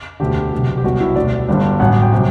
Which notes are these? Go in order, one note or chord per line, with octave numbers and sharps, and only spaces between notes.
E1 D2 D3 G4
C2 B2 F#3
G4
B1 B2 G3 F#4
E4
D2 D3 G3 D5
G1 G2 D3 G3
A1 G2 F#3 F#5
G5
C3 F#3